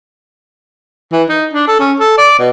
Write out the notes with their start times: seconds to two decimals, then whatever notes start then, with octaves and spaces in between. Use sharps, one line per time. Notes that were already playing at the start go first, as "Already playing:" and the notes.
1.12 E3
1.29 D#4
1.53 D4
1.67 A4
1.80 C#4
2.00 A4
2.18 D5
2.39 B2